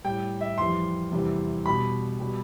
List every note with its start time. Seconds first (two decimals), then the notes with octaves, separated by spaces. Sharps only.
0.04 A2 G3 G5
0.41 E5
0.58 F2 E3 G3 C6
1.12 E2 C3 E3 G3
1.65 B2 G3 B5
2.20 B2 G3